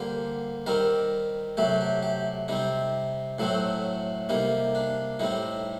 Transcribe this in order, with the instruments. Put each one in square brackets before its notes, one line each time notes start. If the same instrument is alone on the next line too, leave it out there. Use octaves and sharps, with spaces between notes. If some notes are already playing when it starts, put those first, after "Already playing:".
Already playing: [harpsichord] D3 G3 A#3 C5
D#3 G3 C4 A#4
C3 F#3 A3 G4
G4
G4
C3 G3 C4 D#4
A2 F#3 A3 C4
C3 G3 A#3 D#4
D4
A2 G3 C4 D#4